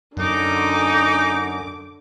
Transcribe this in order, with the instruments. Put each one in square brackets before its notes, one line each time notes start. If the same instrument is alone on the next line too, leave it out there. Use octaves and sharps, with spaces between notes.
[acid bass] F#2 [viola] D3 D6 [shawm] D#4